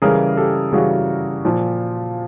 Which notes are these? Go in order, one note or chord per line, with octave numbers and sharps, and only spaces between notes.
C#3 E3 G3 G#4 A#4
G4 A4
C#3 E3 G3 F#4 G#4
A#2 F3